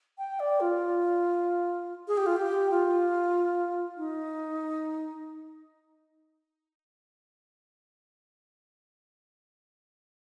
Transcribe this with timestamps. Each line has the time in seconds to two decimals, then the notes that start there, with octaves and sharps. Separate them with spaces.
0.18 G5
0.40 D5
0.60 F4
2.08 G#4
2.17 G4
2.26 F4
2.36 G4
2.71 F4
3.97 D#4